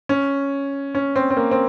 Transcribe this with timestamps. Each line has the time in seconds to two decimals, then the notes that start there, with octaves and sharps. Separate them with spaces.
0.09 C#4
0.95 C#4
1.16 C4
1.31 C4
1.37 A#3
1.51 C4